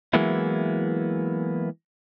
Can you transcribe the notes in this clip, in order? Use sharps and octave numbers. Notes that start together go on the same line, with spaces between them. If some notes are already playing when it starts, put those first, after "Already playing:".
E3 F#3 G#3 A#3 B3 E4